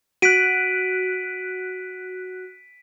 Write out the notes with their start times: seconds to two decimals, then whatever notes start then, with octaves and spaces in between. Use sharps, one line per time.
0.22 F#4 F#6 B6 D7 D#7